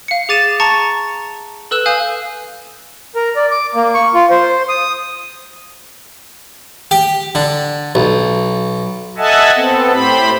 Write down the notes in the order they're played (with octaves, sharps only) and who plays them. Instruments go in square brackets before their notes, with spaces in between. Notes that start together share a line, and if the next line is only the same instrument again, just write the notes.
[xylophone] F5 C#7
G#4 D6 A6 D#7 E7
A5 A#5 C#6 A6 C#7
A4 B4 E6 F#6 E7
F5 G#5 D#6 G6
[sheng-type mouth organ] A#4
D5
D6
A#3
C#6
F4
C5
D#6
[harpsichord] G4
D3
B1
[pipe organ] A4 D#5 E5 F#5 G#5 A5
B3 C4 A4
A2 G4 C5 B5